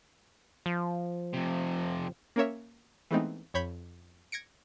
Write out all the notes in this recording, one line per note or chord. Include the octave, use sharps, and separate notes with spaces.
F3
F2 C3
A#3 C#4 A#4 C#5 E5
E3 G#3 A3 B3 C4 D#4
F2 C#5 B5 G6 G#6 B6
G#6 A#6 C#7 D7